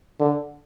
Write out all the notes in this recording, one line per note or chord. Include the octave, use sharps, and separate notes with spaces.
D3